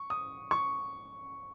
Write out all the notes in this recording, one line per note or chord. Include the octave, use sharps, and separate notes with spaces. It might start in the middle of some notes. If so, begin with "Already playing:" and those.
Already playing: C#6
D#6
C#6